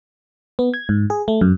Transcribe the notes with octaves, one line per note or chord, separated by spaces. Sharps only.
B3
G#6
G#2
G#4
A3
F#2